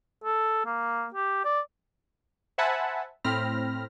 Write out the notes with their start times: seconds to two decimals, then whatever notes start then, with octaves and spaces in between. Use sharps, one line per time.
0.24 A4
0.66 A#3
1.14 G4
1.45 D5
2.58 C5 E5 F#5 G#5 A5 B5
3.24 A2 C4 B5 F6 A#6